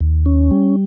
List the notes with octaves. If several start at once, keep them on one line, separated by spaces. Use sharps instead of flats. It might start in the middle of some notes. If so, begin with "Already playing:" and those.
D#2
C#4
G3